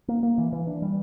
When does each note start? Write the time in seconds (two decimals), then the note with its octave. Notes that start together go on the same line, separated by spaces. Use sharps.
0.08 A#3
0.23 A#3
0.38 E3
0.53 E3
0.67 D4
0.82 G3